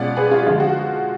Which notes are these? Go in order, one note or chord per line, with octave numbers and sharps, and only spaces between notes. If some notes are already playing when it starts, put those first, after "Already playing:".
Already playing: B2 G#3 C#4 F4 D5 F#5
G#4 B4
F4 G#4
D3 F3 G#3 F4
F#4